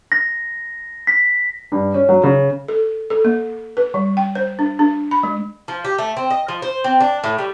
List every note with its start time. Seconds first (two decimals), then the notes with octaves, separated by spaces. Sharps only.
0.12 A#6
1.07 B6
1.72 G2
1.94 C#4
2.09 F#3
2.23 C#3
2.68 A4
3.10 A4
3.25 A#3
3.77 B4
3.94 G3
4.17 G5
4.35 C5
4.59 D4
4.79 D4
5.11 B5
5.23 G#3
5.68 F3
5.85 G4
5.98 A3
6.17 C4
6.30 D#5
6.48 F3
6.62 C5
6.84 C4
7.00 D4
7.24 A2
7.38 G3